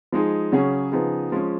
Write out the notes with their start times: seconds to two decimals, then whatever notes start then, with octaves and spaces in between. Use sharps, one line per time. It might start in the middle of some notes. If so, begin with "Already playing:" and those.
0.12 F3 G#3 D#4 G#4
0.52 C#3 F#3 C#4 G#4
0.92 C#3 F3 B3 D#4 G#4
1.32 F3 G#3 C#4